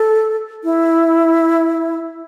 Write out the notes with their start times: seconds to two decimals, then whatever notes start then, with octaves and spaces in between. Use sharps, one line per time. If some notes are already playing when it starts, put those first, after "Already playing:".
Already playing: A4
0.64 E4